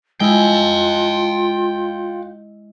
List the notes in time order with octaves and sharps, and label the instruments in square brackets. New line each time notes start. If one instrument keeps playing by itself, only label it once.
[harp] G#3 E4 [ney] F4 [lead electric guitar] F5 G5